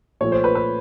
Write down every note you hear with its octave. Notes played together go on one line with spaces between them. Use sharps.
A#2 F3 A3 C#5
C5
B4
B4